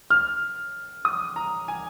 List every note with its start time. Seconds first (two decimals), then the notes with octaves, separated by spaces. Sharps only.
0.10 F6
1.05 D#6
1.36 A#5
1.68 G#5